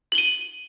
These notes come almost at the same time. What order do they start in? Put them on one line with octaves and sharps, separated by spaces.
F#7 G7 D#7